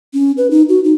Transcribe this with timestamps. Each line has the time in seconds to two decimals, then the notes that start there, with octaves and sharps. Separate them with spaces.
0.14 C#4
0.37 B4
0.51 D#4
0.69 F#4
0.84 D#4